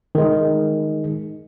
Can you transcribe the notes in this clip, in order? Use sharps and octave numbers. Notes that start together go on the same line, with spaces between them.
D#3 G#3